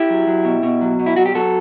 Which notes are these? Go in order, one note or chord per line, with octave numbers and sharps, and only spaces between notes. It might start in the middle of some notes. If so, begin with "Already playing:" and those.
Already playing: E4 G4
F#3
F#3
B2
B2
F#3
B2
E4
F#3 F#4
G4
F#3 F#4 A4